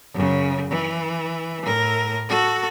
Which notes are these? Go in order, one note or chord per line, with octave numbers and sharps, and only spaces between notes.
F#2 C#3
E3
A2 A#4
F#4 A4